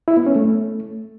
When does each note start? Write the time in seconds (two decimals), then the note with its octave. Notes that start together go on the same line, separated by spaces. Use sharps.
0.08 E4
0.17 B3
0.26 C#4
0.36 A3